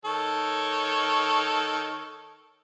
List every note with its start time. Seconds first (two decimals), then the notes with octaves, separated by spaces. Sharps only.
0.05 D#3 A4 C#5